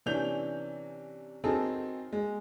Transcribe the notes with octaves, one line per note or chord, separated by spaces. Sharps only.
C3 E3 C#4 D4 G6 F7
D#3 F#3 C4 D#4 G#4 A4
G#3